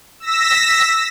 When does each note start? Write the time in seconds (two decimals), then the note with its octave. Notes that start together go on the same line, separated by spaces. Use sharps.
0.20 E6 A#6 B6